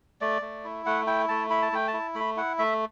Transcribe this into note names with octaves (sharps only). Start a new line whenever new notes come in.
A3 D5
A3
E4
A3 F#5
E4 G5
A3 A5
E4 B5
A5
A3 G5
A5
E4
A3 B5
E4 F#5
A3 E5